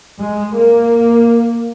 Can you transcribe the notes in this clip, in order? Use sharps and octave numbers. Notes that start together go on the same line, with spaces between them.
G#3
A#3